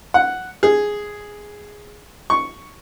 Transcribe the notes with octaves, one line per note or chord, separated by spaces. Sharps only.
F#5
G#4
C#6